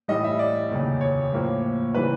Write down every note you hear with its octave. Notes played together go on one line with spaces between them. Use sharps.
A2 E3 G3 D#5
E5
D5
F1 D#2 C#3
C#5
A2 F3 A#3
C#3 E3 G3 B4